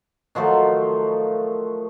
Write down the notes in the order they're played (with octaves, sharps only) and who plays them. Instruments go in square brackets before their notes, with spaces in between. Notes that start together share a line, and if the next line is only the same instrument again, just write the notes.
[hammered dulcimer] D#3 F3 F#3 A3